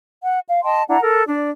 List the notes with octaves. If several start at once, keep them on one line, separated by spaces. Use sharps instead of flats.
F#5
F5
D#5 G5 A5 C6
D4 E4 F#5 A#5
A4 A#4
D4 D5